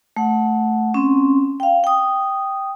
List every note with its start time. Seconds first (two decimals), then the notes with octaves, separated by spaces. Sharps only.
0.16 A3 F#5
0.94 C4 C#4
1.60 F5 G5
1.84 G5 D#6